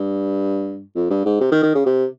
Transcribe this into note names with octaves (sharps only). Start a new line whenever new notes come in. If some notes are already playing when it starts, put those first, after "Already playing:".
Already playing: G2
F2
G2
G#2
C3
D#3
D#3
C#3
C3